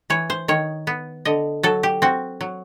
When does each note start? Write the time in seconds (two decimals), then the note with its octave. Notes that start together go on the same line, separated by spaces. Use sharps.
0.10 E3 C#5
0.30 C5
0.48 D#3 C#5
0.87 B3
1.25 D3 D#5
1.63 F#3 A4
1.83 G4
2.02 C4 F#4
2.41 F#3